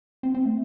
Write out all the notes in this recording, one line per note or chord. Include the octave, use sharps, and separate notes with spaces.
C4
C4
A3